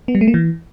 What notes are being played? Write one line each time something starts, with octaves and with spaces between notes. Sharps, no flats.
B3
G3
A3
A#3
E3